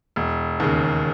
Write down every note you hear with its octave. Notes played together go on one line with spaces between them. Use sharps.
E1
D#2 C#3